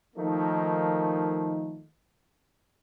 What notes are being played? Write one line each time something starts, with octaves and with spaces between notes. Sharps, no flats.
D#3 F3 A3 A#3 D#4